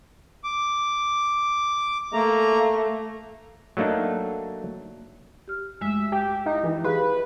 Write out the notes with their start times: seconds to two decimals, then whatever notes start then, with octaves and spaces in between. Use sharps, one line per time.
0.44 D6
2.13 A3 A#3 A#5
3.77 F#3 A3 A#3 D4 D#4
5.48 G4 F6
5.81 F#2 G#3 A3 E5
6.12 G4
6.46 D#4 E4
6.63 E3
6.84 G4 G#4 B4 F5